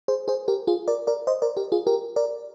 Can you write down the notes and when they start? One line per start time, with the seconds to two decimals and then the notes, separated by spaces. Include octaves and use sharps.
0.08 G#4 C5
0.28 G#4 C5
0.48 G4 A#4
0.67 F4 G#4
0.88 A#4 D5
1.07 A#4 D5
1.27 C5 D#5
1.42 A#4 D5
1.57 G4 A#4
1.72 F4 G#4
1.87 G4 A#4
2.16 A#4 D5